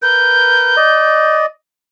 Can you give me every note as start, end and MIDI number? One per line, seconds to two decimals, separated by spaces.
0.02 0.76 70
0.02 0.76 71
0.02 1.36 91
0.76 1.46 74
0.76 1.46 75